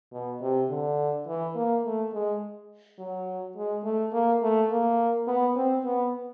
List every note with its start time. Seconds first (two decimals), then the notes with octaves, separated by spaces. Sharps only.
0.12 B2
0.41 C3
0.69 D3
1.27 E3
1.55 A#3
1.84 A3
2.13 G#3
2.98 F#3
3.56 G#3
3.84 A3
4.13 A#3
4.42 A3
4.70 A#3
5.27 B3
5.56 C4
5.85 B3